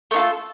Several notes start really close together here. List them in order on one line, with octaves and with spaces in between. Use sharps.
A3 D4 F4 A4